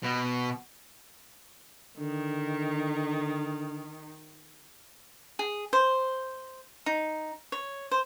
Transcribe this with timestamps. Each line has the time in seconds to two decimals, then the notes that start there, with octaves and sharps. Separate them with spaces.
0.03 B2
1.99 D3 D#3
5.39 G#4
5.73 C5
6.86 D#4
7.52 C#5
7.91 C5